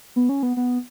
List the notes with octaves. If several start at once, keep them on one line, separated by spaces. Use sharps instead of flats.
B3
C#4
B3
B3